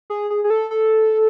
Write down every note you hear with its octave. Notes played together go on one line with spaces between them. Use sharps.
G#4
G#4
G#4
A4
A4